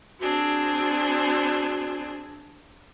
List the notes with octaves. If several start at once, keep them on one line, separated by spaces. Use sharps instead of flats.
C4 D4 F#4 G#4